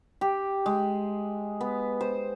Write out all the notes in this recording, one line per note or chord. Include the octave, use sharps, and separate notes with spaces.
G4
G#3
B3
C5